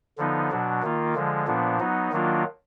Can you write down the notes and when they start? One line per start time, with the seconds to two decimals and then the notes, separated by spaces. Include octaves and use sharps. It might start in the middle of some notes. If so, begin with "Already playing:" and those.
0.18 D3 F3 B3 D#4
0.50 B2 F#3 D4
0.83 D#3 A#3 F4
1.15 D3 F3 G#3
1.47 A#2 F3 B3 D4
1.80 F#3 B3 D#4
2.12 D#3 F#3 A#3 D4 F4